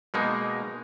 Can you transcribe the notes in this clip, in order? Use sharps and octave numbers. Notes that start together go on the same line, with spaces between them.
B2 G#3 A#3 D#4